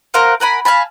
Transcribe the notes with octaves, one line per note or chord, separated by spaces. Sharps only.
A#4 C5 F5 F#5
A#4 F#5 G#5 B5
F5 G#5 A5 B5